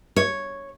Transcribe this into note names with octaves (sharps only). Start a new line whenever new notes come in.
C#5